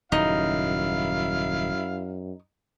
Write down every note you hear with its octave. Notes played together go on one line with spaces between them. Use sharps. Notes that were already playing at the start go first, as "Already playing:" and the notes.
D#1 F#2 C#3 D#4 E4 F5